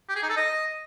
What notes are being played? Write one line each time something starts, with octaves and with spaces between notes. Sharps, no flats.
G4
G#4
D#4
A4
D#5